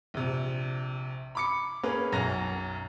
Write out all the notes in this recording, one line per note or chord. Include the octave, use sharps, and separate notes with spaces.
A#1 C3
B5 D6 C#7
A#3 C#4 G#4 B4
B1 F#2 C#4 A#5 A#6